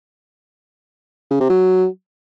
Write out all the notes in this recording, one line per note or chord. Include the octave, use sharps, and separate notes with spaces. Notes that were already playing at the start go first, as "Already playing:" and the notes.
C#3
C3
F#3